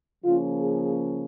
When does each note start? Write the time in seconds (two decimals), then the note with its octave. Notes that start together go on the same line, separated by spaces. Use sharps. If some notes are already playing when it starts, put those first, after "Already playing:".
0.23 C#3 F3 A#3 C#4 F4
0.59 G#4